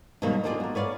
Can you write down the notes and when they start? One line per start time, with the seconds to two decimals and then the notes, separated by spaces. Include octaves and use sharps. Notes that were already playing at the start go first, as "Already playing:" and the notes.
0.22 B2 D#3 F#3 G3 A#3
0.44 A#3 D4 F4 G4 G#4 D5
0.60 F#4 A#4
0.75 B4 C#5 D5 F5